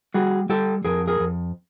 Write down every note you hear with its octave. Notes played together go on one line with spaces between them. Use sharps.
G3 F#4 G#4
G3 G4 A4
F2 G#4 A#4
G#4 A#4
F2